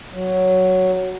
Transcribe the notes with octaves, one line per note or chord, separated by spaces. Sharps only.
F#3